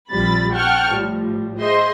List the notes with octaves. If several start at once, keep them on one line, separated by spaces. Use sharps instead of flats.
A#1 C3 F3 G3 B5 A6
F#5 G5 A5 C#6 F6
A2 F3 G3
G#4 C5 D#5 E5 C6